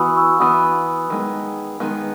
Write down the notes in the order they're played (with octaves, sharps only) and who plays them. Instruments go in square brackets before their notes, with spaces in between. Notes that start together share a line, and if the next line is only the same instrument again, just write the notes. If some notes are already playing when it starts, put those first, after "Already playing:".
Already playing: [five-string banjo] E3 B3 F#4 [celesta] B5 C#6 D#6 E6
[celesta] C#6 E6
[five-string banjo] E3 B3 F#4 [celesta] B5 D#6
[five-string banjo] D#3 G#3 B3
D#3 G#3 B3